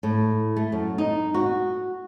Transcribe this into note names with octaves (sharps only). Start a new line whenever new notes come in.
A2
A3
F#2
D#4
F#4